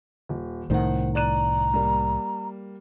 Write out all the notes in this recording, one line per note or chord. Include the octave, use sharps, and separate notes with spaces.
D#1
C2 A2 D#3 C5 F#5
D5 A#5 F#6 D#7
G3 A#3